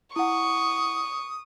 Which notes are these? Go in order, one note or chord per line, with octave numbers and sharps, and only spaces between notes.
E4 F#5 C#6 D#6